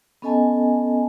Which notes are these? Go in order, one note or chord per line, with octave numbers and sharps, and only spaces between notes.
B3 C#4 A4 D#5 G#5 A5